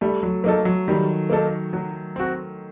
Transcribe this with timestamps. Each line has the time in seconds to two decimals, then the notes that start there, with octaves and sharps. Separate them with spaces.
0.01 G3 A3
0.23 F#3
0.44 F#3 A#3 D#4 A4
0.65 F#3
0.88 D#3 G3
1.29 A#3 D#4 A4
1.73 F#3
2.16 C4 F#4